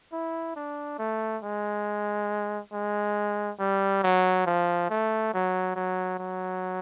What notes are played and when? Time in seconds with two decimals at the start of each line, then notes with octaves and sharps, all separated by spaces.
0.13 E4
0.56 D4
0.99 A3
1.43 G#3
2.73 G#3
3.60 G3
4.03 F#3
4.46 F3
4.90 A3
5.33 F#3
5.76 F#3
6.19 F#3